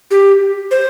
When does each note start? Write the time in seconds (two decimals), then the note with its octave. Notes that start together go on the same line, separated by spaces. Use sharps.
0.11 G4
0.71 C5